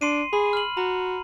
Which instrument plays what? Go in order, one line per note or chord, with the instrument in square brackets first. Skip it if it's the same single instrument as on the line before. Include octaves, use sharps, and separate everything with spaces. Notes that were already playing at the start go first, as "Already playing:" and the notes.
[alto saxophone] D4 [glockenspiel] C6 C7 D#7
[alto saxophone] G#4 [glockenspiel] B5
[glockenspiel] F6 F#7
[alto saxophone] F#4 [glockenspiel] A#5